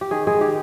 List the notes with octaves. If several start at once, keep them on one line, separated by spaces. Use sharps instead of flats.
G4
D#3 G#4
G#3 G#4
D#3 G4